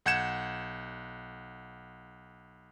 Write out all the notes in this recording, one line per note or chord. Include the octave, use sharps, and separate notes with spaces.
B1 F#5 G6 G#6 C#7 E7